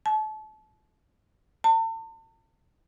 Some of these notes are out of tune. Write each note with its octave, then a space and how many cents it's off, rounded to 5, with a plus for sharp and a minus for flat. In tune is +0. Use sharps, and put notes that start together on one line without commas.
A5 -30
A5 +40